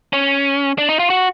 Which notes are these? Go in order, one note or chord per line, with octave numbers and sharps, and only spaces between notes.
C#4
D4
D#4
F4
F#4